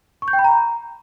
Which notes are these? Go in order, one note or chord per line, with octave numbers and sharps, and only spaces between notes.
C#6
G6
G5
B5
A#5